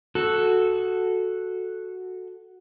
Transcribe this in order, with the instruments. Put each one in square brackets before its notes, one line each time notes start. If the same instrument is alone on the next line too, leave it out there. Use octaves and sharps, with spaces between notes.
[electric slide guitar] F#4 A4